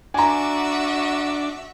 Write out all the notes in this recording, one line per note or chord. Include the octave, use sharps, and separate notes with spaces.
D4 F#4 E5 G#5 A#5